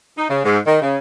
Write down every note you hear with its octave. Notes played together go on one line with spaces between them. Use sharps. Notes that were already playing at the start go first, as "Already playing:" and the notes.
D#4
C#3
G#2
D#3
C#3